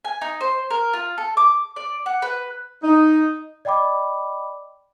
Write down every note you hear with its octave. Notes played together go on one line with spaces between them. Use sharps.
G#5
D#4
C5
A#4
F4
A4
D6
D5
F#5
B4
D#4
D5 D#5 G5 B5 D6